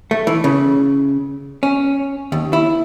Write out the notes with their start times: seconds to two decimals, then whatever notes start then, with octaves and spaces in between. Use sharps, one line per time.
0.11 A3
0.27 E3
0.44 C#3
1.63 C#4
2.32 D#2
2.53 E4